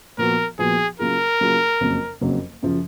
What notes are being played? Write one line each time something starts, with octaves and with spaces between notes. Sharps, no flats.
A#2 F3 B3 F#4 A#4
A#2 F3 B3 F#4 G#4
C#3 F#3 A#3 F4 G#4 A#4
C#3 F#3 A#3 F4 G#4
F#1 F2 C#3 F#3 A#3
F#1 F2 C#3 F#3 A#3
F#2 C#3 F3